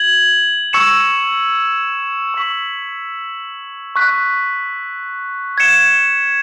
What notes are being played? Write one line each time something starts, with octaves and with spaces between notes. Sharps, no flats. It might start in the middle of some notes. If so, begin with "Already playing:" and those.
Already playing: G#6 F#7
C#6 E6 G#6 C#7 E7
C#6 E6 B6 F#7
C#6 F#6 B6
G#6 C#7 E7